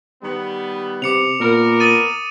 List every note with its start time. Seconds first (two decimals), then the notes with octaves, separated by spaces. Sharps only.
0.23 D#3 G3 B3
1.02 C3 D6 C#7 F7
1.40 A#2 B3 A#4
1.80 D#6 A6 D#7